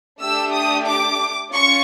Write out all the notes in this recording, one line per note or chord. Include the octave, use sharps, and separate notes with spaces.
A3 D4 G4 E6
D#6
D6
C#4 F4 C#6